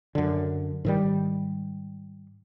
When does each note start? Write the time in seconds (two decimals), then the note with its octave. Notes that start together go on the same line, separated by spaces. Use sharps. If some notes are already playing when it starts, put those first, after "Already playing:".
0.15 F#2 D3
0.85 G#2 D#3 G3